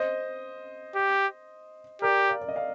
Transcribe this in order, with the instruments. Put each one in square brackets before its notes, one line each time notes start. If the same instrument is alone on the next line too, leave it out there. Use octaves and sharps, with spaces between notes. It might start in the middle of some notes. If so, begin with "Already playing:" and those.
Already playing: [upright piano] C5 D#5
[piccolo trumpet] G4
[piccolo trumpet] G4 [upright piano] A#4 D5
[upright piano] D5 F5
D5
D#5
D5 F5